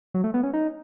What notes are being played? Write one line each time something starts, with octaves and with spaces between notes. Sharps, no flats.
F#3
A3
B3
C#4
D#4